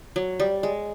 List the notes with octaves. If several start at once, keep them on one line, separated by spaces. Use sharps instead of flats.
F#3
G3
G#3